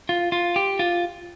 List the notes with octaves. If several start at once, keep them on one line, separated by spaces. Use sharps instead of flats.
F4
F4
G4
F4